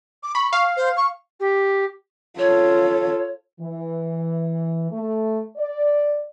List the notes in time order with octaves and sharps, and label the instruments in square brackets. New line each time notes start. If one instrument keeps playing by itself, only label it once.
[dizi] D6
[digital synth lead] B5 [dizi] C#6
[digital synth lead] F5
[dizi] C5
C#6
[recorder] G4
[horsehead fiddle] F4 A4 [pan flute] C#5
[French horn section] E3
A3
D5